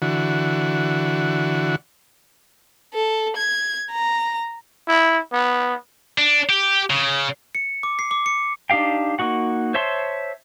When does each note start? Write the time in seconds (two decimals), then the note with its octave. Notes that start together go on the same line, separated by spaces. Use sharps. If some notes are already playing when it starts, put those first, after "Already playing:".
0.02 D3 E3 F#4
2.94 A4
3.37 G#6
3.92 A#5
4.88 E4
5.33 B3
6.18 D4
6.50 G4
6.90 C#3
7.55 C#7
7.83 D6
7.99 C7
8.11 D6
8.26 C#7
8.70 D4 D#4 G4 F5 G5
9.19 A#3 D#4 F#4 F#5
9.74 C5 C#5 E5 A5 C6